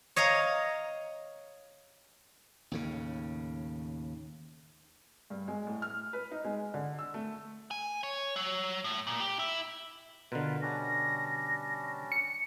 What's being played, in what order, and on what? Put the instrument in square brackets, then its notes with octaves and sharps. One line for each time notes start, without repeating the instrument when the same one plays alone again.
[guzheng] C#5 D#5 F5 A#5
[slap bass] D#2 A2 C#3
[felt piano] G2
G#3
A2
F6
B4
D#4
G#3
D3
E6
A3
[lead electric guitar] G#5
C#5
F#3
A2
A#2
G4
E4
[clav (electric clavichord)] B2 D3 [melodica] F4 A#4 B4
[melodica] G3 C#4 D4 [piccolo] A#6
[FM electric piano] C#7